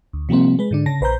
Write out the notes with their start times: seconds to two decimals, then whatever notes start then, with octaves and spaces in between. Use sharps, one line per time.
0.13 D2
0.29 C3 F3 G3 A#3 C4
0.59 G#3 B4
0.71 G#2 D3 D4
0.86 C#3 A5 A#6
1.01 A#1 B4 C5 A#5 G6